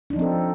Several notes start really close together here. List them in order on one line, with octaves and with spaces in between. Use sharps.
D4 D#4 F3 C4 A4